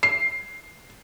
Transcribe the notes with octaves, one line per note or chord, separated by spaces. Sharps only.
C7